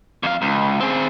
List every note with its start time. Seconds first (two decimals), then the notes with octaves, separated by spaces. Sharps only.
0.23 F2 F5
0.42 C#2
0.80 C4 G#4